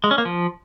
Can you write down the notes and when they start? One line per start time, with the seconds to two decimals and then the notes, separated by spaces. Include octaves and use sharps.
0.04 G#3
0.11 C#4
0.18 A#3
0.25 F3